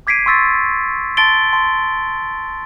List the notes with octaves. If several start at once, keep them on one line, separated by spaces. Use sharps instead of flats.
D6 G#6 B6 C7 D7 D#7
C6 C#6 E6 A6 B6
A5 C6 A6 D7 G7
A5 C6